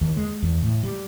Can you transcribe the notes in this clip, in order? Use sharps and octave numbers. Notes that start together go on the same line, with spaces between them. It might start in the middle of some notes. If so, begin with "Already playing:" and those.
D#2
G#3
E2
A2
G3